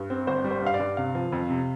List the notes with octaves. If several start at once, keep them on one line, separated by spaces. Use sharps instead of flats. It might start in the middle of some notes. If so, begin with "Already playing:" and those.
Already playing: G2
C4
G1 C5
G3
C5
G2 F5
D5
G2
C3 F5
F3
F2
C3